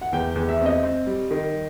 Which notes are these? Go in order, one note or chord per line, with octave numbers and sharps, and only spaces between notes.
F#5
E2 G5
E2
E5
C4
D#5
C4
G3
D#3